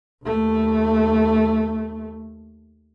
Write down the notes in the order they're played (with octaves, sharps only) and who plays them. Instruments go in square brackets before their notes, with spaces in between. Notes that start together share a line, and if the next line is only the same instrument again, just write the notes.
[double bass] D#2 A3